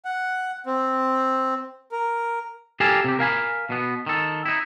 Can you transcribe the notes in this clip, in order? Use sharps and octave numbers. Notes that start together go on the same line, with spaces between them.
F#5
C4
A#4
G4 A4 A#4 F5 G#5 A5
C3 G4
A#4 F5 G#5 B5
B2 B3
D#3 A4
D#4 E4